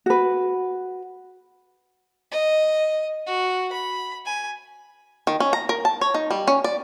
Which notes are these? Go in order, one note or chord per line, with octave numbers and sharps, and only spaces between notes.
F#4 B4
D#5
F#4
B5
G#5
D#3
C#4
A#5
A#4
A5
C#5
D#4
G3
C#4
D5